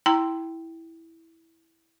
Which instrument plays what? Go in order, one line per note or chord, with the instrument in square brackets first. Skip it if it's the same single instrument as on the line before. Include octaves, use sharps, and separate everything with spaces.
[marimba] E4 G5 A#5 C6